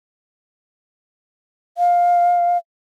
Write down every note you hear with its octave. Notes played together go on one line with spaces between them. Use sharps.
F5